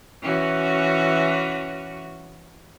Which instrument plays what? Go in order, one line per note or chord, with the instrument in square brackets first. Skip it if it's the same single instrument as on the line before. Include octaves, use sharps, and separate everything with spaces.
[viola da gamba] E3 C#4 F#4